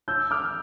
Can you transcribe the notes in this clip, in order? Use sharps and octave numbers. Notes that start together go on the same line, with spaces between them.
E6 G6
D6 F6